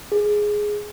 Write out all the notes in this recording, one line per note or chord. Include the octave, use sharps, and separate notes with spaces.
G#4